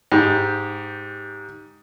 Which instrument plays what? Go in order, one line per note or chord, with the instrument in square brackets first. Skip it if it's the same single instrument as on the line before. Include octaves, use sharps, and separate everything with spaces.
[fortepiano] G#2 G4